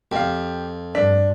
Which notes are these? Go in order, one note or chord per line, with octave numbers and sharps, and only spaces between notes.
F2 G4 F5
G2 D4 B6